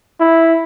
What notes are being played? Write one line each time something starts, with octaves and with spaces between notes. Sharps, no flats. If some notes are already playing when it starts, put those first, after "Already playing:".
E4